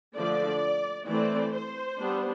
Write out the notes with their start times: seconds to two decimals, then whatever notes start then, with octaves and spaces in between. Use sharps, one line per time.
0.15 D3 F3 A3 D5
1.07 E3 A3 C4 D5
1.53 C5
1.98 G3 B3 D4